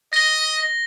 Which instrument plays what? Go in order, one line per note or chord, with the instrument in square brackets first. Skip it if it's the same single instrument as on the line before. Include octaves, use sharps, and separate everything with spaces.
[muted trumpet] D#5 [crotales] A#6 G7